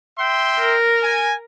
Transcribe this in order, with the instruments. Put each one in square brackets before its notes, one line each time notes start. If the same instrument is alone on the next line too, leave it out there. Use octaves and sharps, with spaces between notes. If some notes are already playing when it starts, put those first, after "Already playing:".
[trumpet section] E5 G5 C6
[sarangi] A#4
[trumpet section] G#5